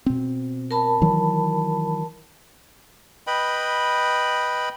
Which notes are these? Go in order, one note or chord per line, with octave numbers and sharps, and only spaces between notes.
B2 C4
A#4 A5 B5
D#3 E3 F#3
B4 D#5 G5 B5